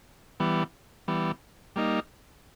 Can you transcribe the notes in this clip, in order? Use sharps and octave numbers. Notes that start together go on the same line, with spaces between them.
E3 G3 B3
E3 G3 B3
G3 A#3 D#4